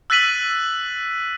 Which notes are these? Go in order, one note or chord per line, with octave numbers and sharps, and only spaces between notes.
E6 F#6 A6 B6 D#7 F#7